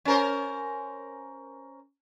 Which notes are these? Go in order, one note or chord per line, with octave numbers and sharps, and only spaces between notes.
C#4 A#4 C5